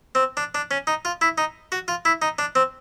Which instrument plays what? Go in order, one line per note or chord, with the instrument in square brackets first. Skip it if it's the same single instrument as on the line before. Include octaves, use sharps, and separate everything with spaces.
[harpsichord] C4
D4
D4
C#4
D#4
F4
E4
D#4
F#4
F4
E4
D#4
D4
C4